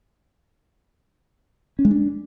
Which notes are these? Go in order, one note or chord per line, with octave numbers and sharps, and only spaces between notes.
C#4
G#3
D4